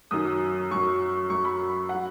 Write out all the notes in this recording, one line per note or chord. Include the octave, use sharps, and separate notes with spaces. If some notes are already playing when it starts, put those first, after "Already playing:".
F#2 D#3 F#3 D#6
F#2 F#3 C#6
F#2 F#3 C#6
B5
F#3 F#5